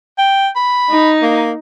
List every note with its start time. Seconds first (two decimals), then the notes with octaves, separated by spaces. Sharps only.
0.18 G5
0.56 B5
0.90 D#4
1.22 A#3